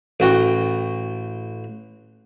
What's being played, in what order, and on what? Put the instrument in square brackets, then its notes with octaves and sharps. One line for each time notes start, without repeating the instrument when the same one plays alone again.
[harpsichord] A1 F#4 G5